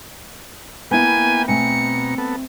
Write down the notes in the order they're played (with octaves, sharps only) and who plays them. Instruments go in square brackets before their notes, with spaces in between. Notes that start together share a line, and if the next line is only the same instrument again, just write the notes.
[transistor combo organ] A#3 B4 G5 [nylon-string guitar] B3 E4 [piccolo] G#5
[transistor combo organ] B2 A#5 [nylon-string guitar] A3 C4 G#5 [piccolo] C#7
[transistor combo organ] B3 A4